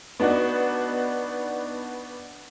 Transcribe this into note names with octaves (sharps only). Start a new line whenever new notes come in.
B3 D4 D#4 F#4